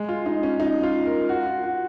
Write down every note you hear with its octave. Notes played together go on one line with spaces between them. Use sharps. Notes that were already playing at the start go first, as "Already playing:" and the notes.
Already playing: G#3
F4
D#4
C#4
D#4
F4
A#4
F#4
F4
F#4